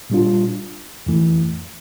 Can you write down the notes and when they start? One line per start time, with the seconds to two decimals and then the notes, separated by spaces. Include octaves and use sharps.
0.10 A#2 G3 D4 F4
1.06 F2 E3 A3